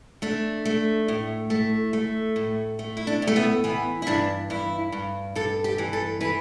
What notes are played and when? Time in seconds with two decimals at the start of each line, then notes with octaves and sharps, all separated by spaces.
0.22 A3 D4
0.65 A3
1.08 A2
1.50 A3
1.93 A3
2.36 A2
2.79 A3
2.97 E4
3.07 D4
3.22 A2
3.27 A3
3.36 B3
3.64 E3 B3
4.02 E4
4.07 G2 D4
4.50 G2 E4
4.92 G2
5.35 G2 A4
5.64 G4
5.78 E3
5.93 A4
6.21 E3 B4